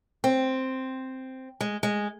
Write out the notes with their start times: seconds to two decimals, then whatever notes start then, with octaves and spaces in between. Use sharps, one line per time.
0.24 C4
1.61 G#3
1.83 G#3